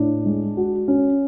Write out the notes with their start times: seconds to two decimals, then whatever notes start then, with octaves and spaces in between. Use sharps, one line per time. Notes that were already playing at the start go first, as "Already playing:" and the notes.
Already playing: A2 D4
0.26 G#3
0.57 F#4
0.88 C#4